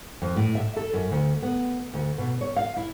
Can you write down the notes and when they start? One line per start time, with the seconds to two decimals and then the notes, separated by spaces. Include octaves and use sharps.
0.22 F2
0.36 A2
0.55 E5
0.76 A4
0.93 F#2
1.11 D2
1.42 B3
1.93 D2
2.18 B2
2.41 C#5
2.56 F5
2.76 E4